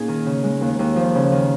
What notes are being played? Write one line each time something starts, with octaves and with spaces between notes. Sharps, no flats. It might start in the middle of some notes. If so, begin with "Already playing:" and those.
Already playing: A#2 C#4 D#4 G#4
D#3
C#3
G#3
D#2
D#2
F3
C#3
D#3